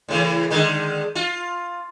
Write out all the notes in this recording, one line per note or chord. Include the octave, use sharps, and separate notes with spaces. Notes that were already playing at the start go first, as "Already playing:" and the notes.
A2 C#3 E3
D3 D#3 G#3
F4